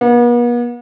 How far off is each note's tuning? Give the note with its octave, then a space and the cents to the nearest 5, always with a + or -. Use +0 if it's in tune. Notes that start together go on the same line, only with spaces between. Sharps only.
B3 -45